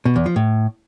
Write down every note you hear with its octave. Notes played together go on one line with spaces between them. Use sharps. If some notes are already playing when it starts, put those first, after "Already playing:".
B2
E2
F3
A2